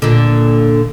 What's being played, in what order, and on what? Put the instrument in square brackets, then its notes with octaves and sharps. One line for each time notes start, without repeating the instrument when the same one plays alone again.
[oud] A#2 D3